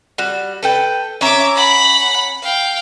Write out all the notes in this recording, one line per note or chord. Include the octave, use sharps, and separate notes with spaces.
G3 F#4
A4 B4 G5
C#4 E5 A#5 D6
F#5 B5
F5 G5